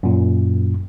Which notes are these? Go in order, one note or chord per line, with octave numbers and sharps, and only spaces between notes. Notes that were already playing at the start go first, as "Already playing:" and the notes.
F#2 A#2